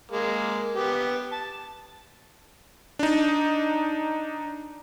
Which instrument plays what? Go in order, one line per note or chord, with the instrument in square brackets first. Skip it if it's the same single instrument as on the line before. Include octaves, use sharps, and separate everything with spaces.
[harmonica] G#3 A#3
B3 G4
A5
[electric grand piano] D4 D#4